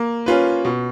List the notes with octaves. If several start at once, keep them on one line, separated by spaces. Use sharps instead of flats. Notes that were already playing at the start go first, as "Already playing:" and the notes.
Already playing: A#3
C#4 F4 B4
B2